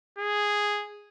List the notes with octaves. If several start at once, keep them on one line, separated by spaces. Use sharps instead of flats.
G#4